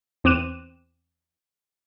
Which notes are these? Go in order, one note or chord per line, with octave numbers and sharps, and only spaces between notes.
E2 C4 D6 F#6 D#7 E7